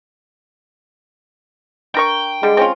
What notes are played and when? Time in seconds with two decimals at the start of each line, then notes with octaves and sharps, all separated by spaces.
1.95 D4 A#4 G5 C#6
2.43 D3 G3 G#3
2.57 C4 C#4 F4